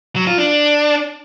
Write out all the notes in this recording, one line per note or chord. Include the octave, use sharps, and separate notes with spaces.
F#3
F4
D4